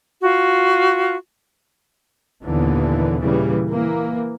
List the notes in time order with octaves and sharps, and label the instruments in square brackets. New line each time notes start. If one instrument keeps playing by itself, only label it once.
[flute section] F4 F#4
[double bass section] D#2 A#2 D3 E3 B3
A#2 C#3 E3 G3
E3 A#3